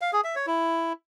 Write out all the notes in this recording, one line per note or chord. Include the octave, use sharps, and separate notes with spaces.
F5
G#4
E5
C#5
E4